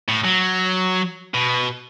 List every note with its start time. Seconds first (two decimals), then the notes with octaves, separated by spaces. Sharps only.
0.08 A2
0.24 F#3
1.34 B2